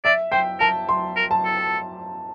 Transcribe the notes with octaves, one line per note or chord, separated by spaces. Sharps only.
D5 E5
C5 G5
A#4 A5
C6
A#4
A5
A4